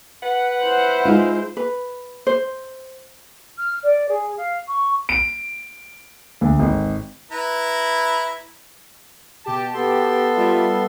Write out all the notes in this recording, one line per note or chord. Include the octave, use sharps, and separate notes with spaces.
B4 F#5
E4 C5
G#3 D#4 F4
B4
C5
F6
D5
G#4
F5
C#6
D7
D2
G#1
E4 B4 A#5
B2 G4 A5
B3 A4 C6
G3 F4 E5